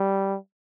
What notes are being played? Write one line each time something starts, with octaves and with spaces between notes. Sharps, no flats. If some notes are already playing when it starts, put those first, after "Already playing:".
Already playing: G3